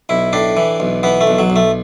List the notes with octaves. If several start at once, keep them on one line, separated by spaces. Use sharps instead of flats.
B1 E4
A2 D4
E3
B1
E3 B3
A3
B1
F#3
B1
A3